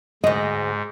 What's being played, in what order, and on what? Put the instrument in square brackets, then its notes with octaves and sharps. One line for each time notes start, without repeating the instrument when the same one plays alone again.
[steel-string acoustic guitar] D2 G#3 [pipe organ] G#2 [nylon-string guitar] D#5